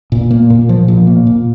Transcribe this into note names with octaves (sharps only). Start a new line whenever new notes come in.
A#2
A#3
A#2
F3
A#2
A#3
A#2